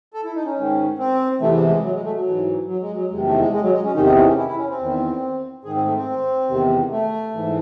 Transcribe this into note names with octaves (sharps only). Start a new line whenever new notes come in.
A4
E4
D#4
C#4
G#2 D#3
C4
E2 C3 E3 A3
G#3
G#3
F#3
G#3
A3
F#3
G#2 E3
F#3
G#3
F#3
E2 C3 D#3 G#3
A3
G#3
G#3
F#3
G#3
C#4
E2 C3 D#3 D#4
D#4
C#4
C#4
E4
E4
C#4
C4
E2 D#3
G#2 D#3 G#4
C4
A3
C4
E2 C3 D#3
A3
G#2 E3